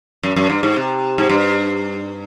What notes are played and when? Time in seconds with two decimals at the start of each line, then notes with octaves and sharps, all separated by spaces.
0.23 F#2
0.36 F#2
0.50 G2
0.63 G#2
0.76 C3
1.18 G#2
1.29 G2